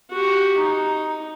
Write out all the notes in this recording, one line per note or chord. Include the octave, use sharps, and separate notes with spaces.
F#4 G4
D#4